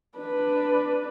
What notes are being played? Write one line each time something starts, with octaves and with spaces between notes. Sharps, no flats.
D4 B4